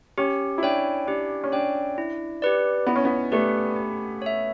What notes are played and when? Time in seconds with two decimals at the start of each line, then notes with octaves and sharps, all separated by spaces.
0.18 C#4 G4
0.58 E4
0.63 D4 C#5 G5
1.07 D4 G4
1.44 C#4
1.52 D4 C#5 G5
1.98 E4
2.42 G4 B4 D5
2.87 B3 E4
2.96 C#4
3.05 B3
3.32 A3 G4 B4 D5
3.76 G4
4.22 C#5 E5